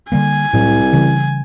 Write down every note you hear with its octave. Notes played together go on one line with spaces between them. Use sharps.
D3 G3 A#3 G#5
C2 A2 F#3
C#3 E3 G3